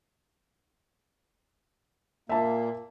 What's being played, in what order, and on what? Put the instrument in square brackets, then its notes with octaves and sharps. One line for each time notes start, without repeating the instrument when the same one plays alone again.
[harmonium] A#2 A#3 [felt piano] E5 A5